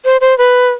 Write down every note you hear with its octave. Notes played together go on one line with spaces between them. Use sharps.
C5
C5
B4